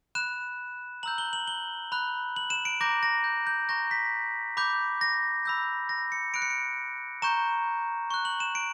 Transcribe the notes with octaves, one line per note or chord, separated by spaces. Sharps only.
B5 F#6 E7
A#5 E6 G6 F#7
G7
F#7
G7
B5 F#6
F#7
E7
D7
A#5 D6 G6 A#6
A#6
G6
G6
A#5 C#6 G6 A#6
B6
B5 D6 G6
A#6
B5 E6 G6
A#6
C#7
B5 F#6 D7
C#7
D7
A#5 C#6 G6 E7
C#6 F#6
F#7
E7
D7